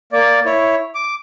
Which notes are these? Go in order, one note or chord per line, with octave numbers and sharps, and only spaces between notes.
A#3 D5
E4 C#5
D6